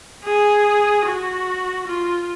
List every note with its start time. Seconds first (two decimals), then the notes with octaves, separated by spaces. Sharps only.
0.24 G#4
1.05 F#4
1.87 F4